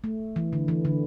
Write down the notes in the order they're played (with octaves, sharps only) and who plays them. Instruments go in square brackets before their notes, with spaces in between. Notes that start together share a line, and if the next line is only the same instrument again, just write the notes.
[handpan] A3
E3
D3
E3
D3